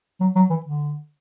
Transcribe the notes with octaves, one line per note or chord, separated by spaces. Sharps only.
F#3
F#3
E3
D3